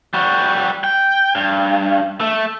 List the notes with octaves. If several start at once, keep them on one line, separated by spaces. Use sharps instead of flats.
G3 F#4
G5
G2
A3